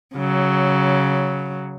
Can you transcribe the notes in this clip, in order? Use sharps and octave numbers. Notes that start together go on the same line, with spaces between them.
C#3 F#3